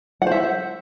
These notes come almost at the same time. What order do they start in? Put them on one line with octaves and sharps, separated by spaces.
F#5 C5 E5